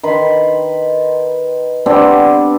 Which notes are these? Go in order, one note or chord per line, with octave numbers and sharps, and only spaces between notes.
D#3 B4 B5 C6
G3 B3 C4 D4